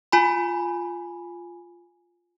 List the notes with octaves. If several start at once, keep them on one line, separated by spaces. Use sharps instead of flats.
F4 G#5 B5